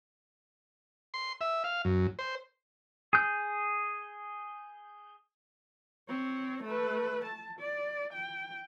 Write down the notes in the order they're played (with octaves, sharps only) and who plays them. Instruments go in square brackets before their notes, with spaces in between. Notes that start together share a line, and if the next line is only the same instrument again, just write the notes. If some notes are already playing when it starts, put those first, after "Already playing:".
[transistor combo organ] C6
E5
F5
F#2
C5
[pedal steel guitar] G#4 G6
[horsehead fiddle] C4 C#5
A3 B4
A5
D5
G5